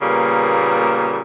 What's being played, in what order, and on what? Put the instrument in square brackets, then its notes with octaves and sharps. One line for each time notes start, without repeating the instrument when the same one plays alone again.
[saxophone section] A#2 C#3 G3 A#3 B3